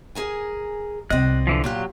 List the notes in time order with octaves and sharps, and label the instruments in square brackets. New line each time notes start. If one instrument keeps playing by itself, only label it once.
[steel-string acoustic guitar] G#4 A#4 G#5
[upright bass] C2 C3 [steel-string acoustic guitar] C4 D5 D#5 [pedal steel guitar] F#6
[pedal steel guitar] D3 E3 F3
[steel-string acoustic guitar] A#2 F4 G4 [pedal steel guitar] F#3 F#6